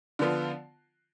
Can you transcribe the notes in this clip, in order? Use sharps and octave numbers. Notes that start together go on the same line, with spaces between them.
D3 F3 B3 F4